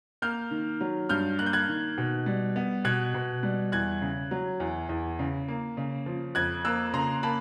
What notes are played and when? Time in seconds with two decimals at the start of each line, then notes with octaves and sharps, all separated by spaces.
0.22 A#3 F6 G6
0.51 D#3
0.81 F#3
1.09 G2 F6 G6
1.39 A#3 F#6
1.46 G6
1.53 F#6 G#6
1.68 D#3
1.98 B2
2.26 G3
2.56 B3
2.85 B2 F#6 G#6
3.14 B2
3.43 G3
3.72 E2 F#6 G#6
4.02 C#3
4.31 F#3
4.60 E2
4.89 E2
5.19 C#3
5.48 A#3
5.77 C#3
6.06 F3
6.35 F2 F#6 G#6
6.65 A#3 E6 F#6
6.93 C#3 A#5 C6
7.23 A#3 A5 B5